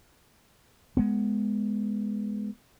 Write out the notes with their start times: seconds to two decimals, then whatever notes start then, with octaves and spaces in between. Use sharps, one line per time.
0.97 G#3 B3